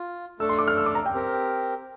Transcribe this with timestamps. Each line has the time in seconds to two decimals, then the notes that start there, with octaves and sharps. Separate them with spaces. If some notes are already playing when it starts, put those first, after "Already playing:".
Already playing: F4
0.40 A3 D4 A4 E6
0.49 C6
0.59 D6
0.68 F6
0.77 E6
0.86 D6
0.95 A#5
1.06 G5
1.14 C4 G4 A#4